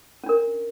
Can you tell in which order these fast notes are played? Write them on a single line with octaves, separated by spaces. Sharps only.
C#4 D4 A#4